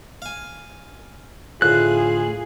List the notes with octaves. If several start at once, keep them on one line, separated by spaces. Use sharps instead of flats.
F5 G#5
D2 A2 F4 G#4 F#6